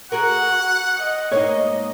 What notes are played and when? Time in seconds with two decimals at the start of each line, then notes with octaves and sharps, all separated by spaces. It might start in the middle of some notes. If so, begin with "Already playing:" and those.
0.12 F#4 G#4 A#4 F#5
0.98 D#5
1.31 G#2 A#3 D#4 C#5